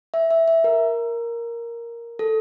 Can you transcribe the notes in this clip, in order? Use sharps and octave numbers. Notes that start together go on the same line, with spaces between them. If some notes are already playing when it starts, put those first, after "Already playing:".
E5
E5
E5
A#4
A4